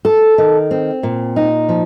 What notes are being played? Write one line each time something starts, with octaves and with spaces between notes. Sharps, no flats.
A4
D#3
C4
A#2
D#4
F3